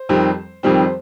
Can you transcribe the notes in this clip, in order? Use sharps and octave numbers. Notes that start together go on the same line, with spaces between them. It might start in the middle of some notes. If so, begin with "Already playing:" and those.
Already playing: C5
F2 D#3 G3 C4
F2 D#3 G3 C4 C5